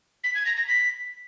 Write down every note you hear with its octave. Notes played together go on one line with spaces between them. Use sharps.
B6
G#6
A#6
A#6
B6